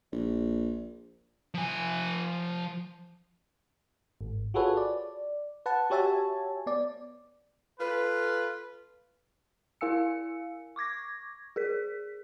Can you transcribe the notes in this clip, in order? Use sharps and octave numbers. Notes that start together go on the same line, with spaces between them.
A#1
F3 G#5
G#1
F4 F#4 G#4 A4 B4 C#5
D5
B4 F#5 A5
F#4 G4 C#5 E5 G#5 A5
B3 D5
F4 A4 B4
E4 A#4 F5 G#5 E6 C#7
C#6 D6 G#6 A#6
G#4 A#4 B6